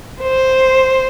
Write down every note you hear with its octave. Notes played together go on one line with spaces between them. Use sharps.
C5